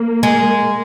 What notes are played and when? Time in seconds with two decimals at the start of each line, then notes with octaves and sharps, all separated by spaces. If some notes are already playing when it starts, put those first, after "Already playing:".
Already playing: A#3
0.23 G#3